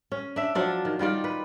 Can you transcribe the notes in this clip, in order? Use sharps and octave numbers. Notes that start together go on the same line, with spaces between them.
C#4
D4 E5
F3 F#3 D4 F4
D#3
D#3 G3 F4 D5
B4